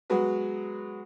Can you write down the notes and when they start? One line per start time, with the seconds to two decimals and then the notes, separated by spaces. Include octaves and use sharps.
0.10 F#3 G#3 B3 F#4 B4